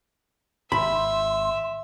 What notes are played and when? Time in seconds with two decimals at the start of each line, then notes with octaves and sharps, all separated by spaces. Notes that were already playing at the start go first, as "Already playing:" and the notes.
0.72 G#1 E5 B5 C6